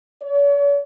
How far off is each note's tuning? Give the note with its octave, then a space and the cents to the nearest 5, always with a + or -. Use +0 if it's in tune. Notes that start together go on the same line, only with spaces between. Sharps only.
C#5 +45